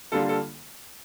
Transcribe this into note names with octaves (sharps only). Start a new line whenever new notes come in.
D3 G3 A#3 D4 F4 A4
A4